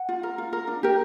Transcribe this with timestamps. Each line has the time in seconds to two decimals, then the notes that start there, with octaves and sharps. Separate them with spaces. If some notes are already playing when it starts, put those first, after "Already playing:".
Already playing: F#5
0.09 F4
0.23 A#4
0.38 F4
0.53 A#4
0.67 D4
0.83 G4 A#4